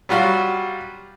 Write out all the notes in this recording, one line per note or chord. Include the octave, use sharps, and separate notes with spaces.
F#3 G3 F4 F#4